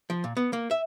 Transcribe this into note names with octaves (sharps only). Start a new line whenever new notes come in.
F3
A#2
B3
A#3
E5